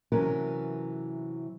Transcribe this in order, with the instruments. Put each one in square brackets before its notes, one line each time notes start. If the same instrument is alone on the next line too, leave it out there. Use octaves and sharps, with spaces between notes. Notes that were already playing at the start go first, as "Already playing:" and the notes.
[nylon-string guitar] C3 E3 F#3 C#4 A4 A#4